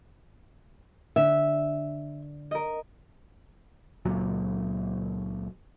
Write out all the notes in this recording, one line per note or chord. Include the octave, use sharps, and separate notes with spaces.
D3 E5
A#4 D#5
C#2 A#2 F#3